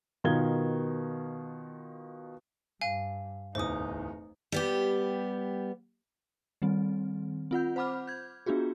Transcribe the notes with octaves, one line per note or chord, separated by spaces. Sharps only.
B2 D#3 F4 A#4 G#6 G7
G2 F5 G#5
D1 E2 D#4 C5 D#6
G3 B3 G4
D#3 G3 C4
C4 F4 F#5 G6
C5 F#5 B5 D6 F6
G6 G#6
B3 D4 F4 F#4 G#4